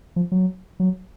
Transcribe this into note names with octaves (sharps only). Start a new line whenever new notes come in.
F3
F#3
F#3